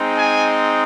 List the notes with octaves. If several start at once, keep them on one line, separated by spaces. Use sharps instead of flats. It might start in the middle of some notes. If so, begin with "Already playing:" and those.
Already playing: G#3 C4 D#4
G#5